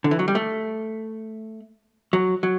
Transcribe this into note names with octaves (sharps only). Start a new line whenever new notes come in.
D3
E3
F#3
G3
A3
F#3
F#3